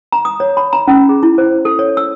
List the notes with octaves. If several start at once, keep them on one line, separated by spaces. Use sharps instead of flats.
A#5
D#6
C#5
B5
A#5
C#4
G#4
E4
C5
A4
C#5
E6